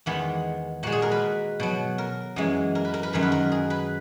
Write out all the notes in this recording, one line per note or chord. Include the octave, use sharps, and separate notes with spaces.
E2 D#3 G#3 B3
A#2 G#3 F#4
G#4
A#4
B4
B2 F#3
A#4
F#2 E3 G#3
A#4
B4
A#4
B4
F#2 D#3 G#3 A#4
B4
A#4
G#4
B4